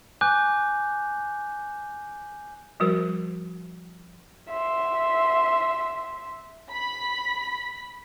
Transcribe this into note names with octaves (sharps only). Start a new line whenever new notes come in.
G#5 D6 F#6 G6
F3 G3 F#4 A#4 C5
E5 C6
B5 B6